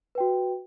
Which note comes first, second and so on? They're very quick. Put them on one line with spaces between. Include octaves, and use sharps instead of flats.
B4 G5 F#4